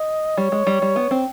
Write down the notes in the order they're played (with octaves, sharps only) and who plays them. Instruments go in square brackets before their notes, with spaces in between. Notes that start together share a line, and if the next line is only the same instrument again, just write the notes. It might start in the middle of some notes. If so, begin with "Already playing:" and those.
Already playing: [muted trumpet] D#5
[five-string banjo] G3 [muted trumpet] C#5
[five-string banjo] G#3
G3
G3
B3
C4